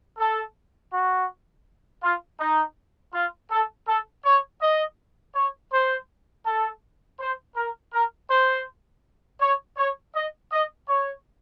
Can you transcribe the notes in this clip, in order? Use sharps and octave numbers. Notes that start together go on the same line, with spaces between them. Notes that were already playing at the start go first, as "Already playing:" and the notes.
A4
F#4
F4
D#4
F4
A4
A4
C#5
D#5
C#5
C5
A4
C5
A#4
A#4
C5
C#5
C#5
D#5
D#5
C#5